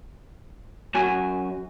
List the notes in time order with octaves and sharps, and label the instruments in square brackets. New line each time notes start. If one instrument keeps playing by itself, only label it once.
[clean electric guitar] F#2 F#4 G#5